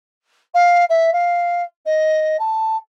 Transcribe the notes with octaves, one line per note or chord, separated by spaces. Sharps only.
F5
E5
F5
D#5
A5